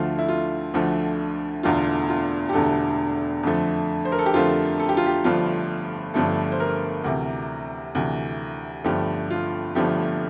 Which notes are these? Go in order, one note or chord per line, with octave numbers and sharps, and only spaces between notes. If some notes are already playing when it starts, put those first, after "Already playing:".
Already playing: D2 D3 F3 A3 F4
E4
F4
D2 D3 F3 A3
E1 E2 D3 A3 F4
F4
G4
E1 E2 D3 A3 A4
F2 D3 F3 A3
C5
A#4
A4
G4
F2 D3 F3 A3 F4
A4
G4
F4
G4
G1 G2 F3 A3 F4
G1 G2 F3 A3 A4
C5
A#4
D2 C3 E3
D2 C3 E3
G1 G2 F3 A3 G4
F4
G1 G2 F3 A3 G4